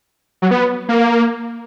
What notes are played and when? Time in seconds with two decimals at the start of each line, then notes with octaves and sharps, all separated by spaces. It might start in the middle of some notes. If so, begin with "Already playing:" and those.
0.42 F#3
0.51 B3
0.89 A#3